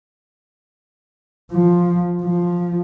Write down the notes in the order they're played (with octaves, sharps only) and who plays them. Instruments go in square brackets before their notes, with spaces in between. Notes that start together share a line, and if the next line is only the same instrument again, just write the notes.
[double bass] F3
F3